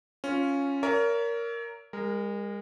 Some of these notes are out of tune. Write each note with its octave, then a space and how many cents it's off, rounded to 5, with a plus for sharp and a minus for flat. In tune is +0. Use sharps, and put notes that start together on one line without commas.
C#4 +0 F4 +0
A#4 +0 C#5 +35 E5 +0
G#3 -40 A#4 +0